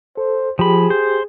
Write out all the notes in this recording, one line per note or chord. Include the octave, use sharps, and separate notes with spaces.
A4 C5
F3 G4 G#4 B5
C5